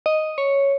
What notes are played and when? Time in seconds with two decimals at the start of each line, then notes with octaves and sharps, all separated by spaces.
0.06 D#5
0.38 C#5